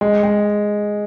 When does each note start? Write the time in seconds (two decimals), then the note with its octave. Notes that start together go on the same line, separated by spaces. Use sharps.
0.01 G#3
0.23 G#3